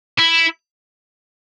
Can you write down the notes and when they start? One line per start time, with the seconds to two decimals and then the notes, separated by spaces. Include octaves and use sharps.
0.19 E4